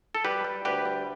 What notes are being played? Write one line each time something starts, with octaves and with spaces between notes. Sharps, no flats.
A4
G3 G4 B4
G3
D2 G4 B4
G3